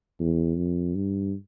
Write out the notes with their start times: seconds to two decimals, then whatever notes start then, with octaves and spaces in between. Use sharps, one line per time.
0.20 E2
0.57 F2
0.95 G2